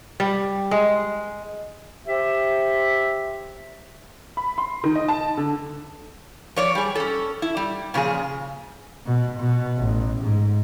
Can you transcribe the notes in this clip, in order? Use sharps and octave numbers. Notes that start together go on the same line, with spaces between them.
G3
G#3
G4 C5 E5
B5
C6
D#3
D#5
A5
D3
F3 C#5 D5
G3 G#4
C#4 A4
E4
G3
A#2 C#3 F3 G#4
B2
B2
A1
G#2